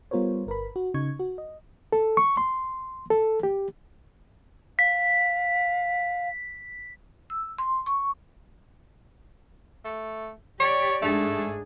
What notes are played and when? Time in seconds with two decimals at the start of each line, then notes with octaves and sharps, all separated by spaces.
0.11 G3 B3 F4 A#4 C5 C#5
0.47 G1 A#4 B4 B5
0.76 F#4
0.94 C#3 D#4 C#6 G#6
1.19 F#4
1.38 D#5
1.93 A4
2.17 C#6
2.37 C6
3.11 A4
3.43 G4
4.79 F5 B6
7.30 E6
7.58 C6
7.86 C#6
9.85 A3
10.60 G4 C#5 D5
11.02 G#2 A3 D4 G#4